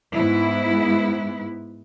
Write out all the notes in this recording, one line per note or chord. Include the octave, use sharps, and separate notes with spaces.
G#2 B3 E4